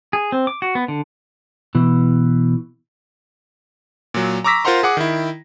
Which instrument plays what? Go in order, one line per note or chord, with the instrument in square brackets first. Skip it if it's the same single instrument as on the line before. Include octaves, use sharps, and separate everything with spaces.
[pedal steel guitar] G#4
C4
D6
F#4
B3
D3
[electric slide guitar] B2 E3
[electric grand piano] A#2 F#3
A#5 C#6 D6 E6 A#6 B6
F4 A#4 C5 F#5 A#5 C6
G#4 F#5 D6
D#3 E4